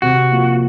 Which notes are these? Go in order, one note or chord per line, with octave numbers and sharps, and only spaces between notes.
C3 F#4
F3 A#3